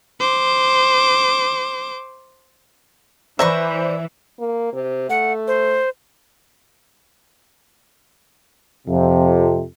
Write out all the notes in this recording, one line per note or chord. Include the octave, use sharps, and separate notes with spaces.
C5 D6
E3 B4 C5 D5 E5 A#5 C#6
A#3
C3
A3 F#5
C5
F2 C3